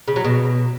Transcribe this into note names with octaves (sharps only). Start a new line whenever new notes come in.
C#3
F#3
B2